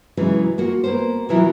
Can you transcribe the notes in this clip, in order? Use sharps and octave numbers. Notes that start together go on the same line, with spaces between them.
C#3 E3 F#3 G#3
A#3 F4 F#4
A#3 B3 C5
B2 E3 F#3 E4 F4 A#4